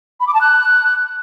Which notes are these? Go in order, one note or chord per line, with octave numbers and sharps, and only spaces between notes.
B5
D6
A5
F#6